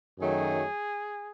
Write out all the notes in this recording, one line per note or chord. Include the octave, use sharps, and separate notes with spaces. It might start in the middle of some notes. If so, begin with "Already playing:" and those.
F#2 D#3 F#3 A3 G#4